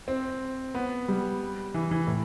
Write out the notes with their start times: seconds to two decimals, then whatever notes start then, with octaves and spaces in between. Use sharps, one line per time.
0.08 C4
0.75 B3
1.08 G3
1.74 E3
1.91 E3
2.07 A2